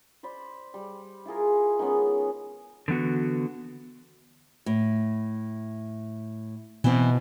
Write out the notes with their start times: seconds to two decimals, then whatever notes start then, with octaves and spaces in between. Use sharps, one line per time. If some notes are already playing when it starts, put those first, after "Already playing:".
0.23 C5 D5 B5
0.74 G3
1.26 E4 F4 G#4 A#4
1.79 D#3 G#3 B3 C#4
2.88 D3 E3 B3 F#4
4.66 A2
6.84 B2 E3 C4